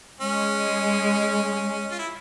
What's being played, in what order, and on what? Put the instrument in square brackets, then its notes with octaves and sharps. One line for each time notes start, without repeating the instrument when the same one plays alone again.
[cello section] G#3 [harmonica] C#4
[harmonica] F4
E4